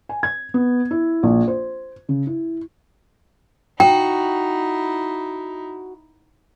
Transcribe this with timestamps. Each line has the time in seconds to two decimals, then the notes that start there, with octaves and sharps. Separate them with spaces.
0.09 G#5
0.23 G#6
0.54 B3
0.91 E4
1.23 A#1
1.48 C5
2.09 C#3
2.27 E4
3.80 D#4 E4 F#4 G5